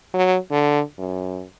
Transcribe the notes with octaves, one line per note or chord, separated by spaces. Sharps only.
F#3
D3
F#2